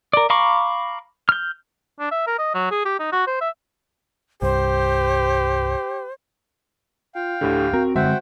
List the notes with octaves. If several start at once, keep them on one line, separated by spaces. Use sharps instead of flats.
A#4 D5
F5 A#5 B5 C#6 D6
F6 G6
D4
E5
A#4
D#5
F#3
G#4
G4
D#4
F#4
C5
E5
C2 G2 G4 C5
F4 F5 G5
D2 A2 D3 G4
C4 F#4 A#4
D3 G#3 C4 C5 E5 F#5 G5